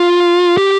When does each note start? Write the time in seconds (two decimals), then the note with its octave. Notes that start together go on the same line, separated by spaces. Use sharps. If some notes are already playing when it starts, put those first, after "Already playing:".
Already playing: F4
0.57 G4